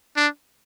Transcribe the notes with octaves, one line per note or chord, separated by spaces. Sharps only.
D4